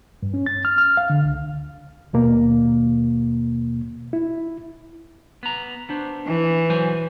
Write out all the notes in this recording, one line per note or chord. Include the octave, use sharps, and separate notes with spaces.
G2
C#4
A6
F6
F6
F5
D3
C#2
D#2 B2 A#3
E4
B3 A#5
B3 D4 C5
E3
F#3 C5 G#5